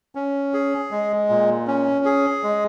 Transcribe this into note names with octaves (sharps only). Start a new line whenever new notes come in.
C#4
G#4
G#3
A#2
C#4
G#4
G#3